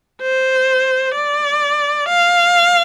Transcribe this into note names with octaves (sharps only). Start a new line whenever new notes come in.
C5
D5
F5